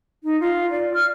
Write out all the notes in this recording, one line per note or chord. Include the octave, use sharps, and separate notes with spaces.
D#4
F4
D5
F6